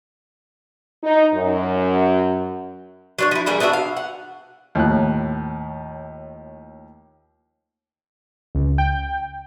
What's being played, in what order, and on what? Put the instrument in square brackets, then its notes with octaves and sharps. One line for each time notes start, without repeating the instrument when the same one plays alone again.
[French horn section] D#4
F#2
[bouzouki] F#3 D4 C#5
F3 E4
E3 G3 A#3 G#4
B3 D4 E4 F#4
F5
F#5
[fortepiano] D#2 A2 F3 F#6
[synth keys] C#2
G5